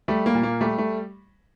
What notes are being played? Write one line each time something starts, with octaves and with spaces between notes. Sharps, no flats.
G3 A3
A#3
A#2
A#3
G3 A3
A3